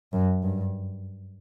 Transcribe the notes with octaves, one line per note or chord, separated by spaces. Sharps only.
F#2
G2